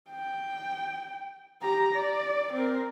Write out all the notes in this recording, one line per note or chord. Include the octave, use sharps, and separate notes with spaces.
G5
G4 A#5
D5
C4 A#4